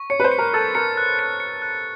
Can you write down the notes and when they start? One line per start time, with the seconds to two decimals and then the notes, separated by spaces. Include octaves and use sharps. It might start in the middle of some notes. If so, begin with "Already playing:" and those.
Already playing: C#6
0.10 C#5 C#7
0.20 B4
0.24 C5
0.32 C#7
0.39 A#4
0.53 A4 A6
0.75 A#4 C#7
0.97 F#6
1.19 C#7
1.40 C#7
1.62 F#6